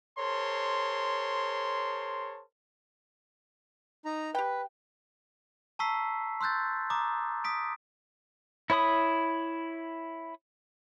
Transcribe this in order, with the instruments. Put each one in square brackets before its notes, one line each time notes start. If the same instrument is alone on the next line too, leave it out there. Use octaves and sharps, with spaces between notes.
[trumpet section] G#4 A#4 C5 C#5 A5 C6
[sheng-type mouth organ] D#4 A#5
[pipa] G4 G5 [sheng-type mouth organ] B4
[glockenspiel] A5 A#5 C#6 E6 B6 C7
C6 E6 F#6 G6 A6
A#5 D6 D#6
D#6 B6 D7
[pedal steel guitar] E4 C#5 B5 D#6